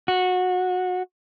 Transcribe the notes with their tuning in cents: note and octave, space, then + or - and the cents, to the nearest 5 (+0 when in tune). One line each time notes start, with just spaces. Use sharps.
F#4 -20